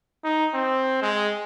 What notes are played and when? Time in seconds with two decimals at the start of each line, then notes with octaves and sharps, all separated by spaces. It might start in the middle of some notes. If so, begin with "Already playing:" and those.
0.24 D#4
0.54 C4
1.02 G#3